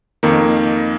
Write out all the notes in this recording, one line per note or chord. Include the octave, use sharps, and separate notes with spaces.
F2 D#3 A#3